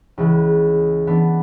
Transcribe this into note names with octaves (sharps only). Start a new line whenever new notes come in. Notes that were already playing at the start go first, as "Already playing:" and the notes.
C#2 C#3 E3
E3 B3 D4